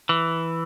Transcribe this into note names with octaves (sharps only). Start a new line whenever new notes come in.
E3